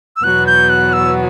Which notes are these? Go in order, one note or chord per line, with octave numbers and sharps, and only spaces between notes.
E6
E2 B2 F#3 B3 F#6
G6
F#6
E6